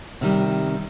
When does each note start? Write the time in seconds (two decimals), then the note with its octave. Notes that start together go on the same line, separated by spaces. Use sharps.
0.21 C3 D#3 G3